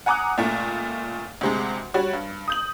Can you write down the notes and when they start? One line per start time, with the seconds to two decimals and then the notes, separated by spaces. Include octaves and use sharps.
0.06 F#5 G#5 A#5 D6 D#6 F#6
0.38 C#2 A#2 A3
1.41 D2 C3 G#3
1.94 G3 F#4 C#5
2.13 G2
2.48 D#6 G6 F#7